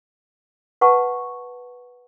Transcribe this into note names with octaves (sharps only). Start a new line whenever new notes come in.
B4 F#5 A5 C#6